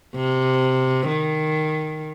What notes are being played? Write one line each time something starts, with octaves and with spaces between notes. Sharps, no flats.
C3
D#3